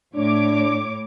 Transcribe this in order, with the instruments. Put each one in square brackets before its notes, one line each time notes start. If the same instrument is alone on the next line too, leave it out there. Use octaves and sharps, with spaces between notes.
[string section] A2 C#5 D6 [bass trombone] D4